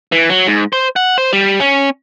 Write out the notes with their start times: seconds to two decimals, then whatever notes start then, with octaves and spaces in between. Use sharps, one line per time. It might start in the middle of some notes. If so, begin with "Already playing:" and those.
0.12 E3
0.30 F#3
0.47 G#2
0.73 C5
0.96 F#5
1.18 C5
1.33 G3
1.60 C#4